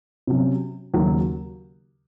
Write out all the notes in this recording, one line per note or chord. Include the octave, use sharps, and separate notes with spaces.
C3 F#3 C#4
D#2 C#3 F#3 A#3